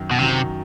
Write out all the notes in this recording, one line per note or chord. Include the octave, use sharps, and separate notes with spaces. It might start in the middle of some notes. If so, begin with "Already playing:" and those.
Already playing: F#2 D#3 F#3
B2
F#2 C3 D#3 F#3